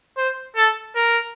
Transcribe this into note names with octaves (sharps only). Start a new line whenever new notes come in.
C5
A4
A#4